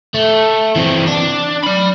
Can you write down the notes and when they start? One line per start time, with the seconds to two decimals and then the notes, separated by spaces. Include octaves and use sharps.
0.14 A3
0.76 E3 C4
1.07 D4
1.64 D5 B5